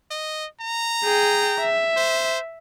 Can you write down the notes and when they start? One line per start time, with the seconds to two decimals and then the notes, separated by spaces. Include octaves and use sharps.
0.11 D#5
0.61 A#5
1.04 G#4 G5
1.59 E5
1.97 C5